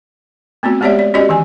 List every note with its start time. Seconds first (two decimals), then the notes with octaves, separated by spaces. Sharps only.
0.63 A3 B3 C4 F#4
0.81 G#3 B3 G4 C#5 D5 E5
0.99 D5
1.14 C#4 F#4 G4 D5 D#5
1.29 D#3 E3 G#5